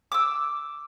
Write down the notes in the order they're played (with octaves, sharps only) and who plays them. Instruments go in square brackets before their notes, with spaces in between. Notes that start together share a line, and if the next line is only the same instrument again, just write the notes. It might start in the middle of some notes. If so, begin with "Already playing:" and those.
[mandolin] D6 E6